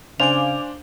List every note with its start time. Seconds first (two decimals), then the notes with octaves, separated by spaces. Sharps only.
0.20 C#3 D4 C5 F5 G#5 D6 F7